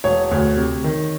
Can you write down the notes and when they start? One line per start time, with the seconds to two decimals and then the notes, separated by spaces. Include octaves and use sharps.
0.04 E1 C#5
0.31 D2
0.57 C3
0.84 D#3